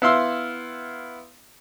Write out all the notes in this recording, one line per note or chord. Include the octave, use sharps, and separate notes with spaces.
B3 E4 F5 C6 E6